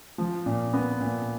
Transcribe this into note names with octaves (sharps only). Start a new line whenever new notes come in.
F3
A#2
B3
A#2